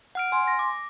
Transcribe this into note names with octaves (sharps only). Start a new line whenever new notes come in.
F#5 F6 D7
G#5 C6
A#6
D6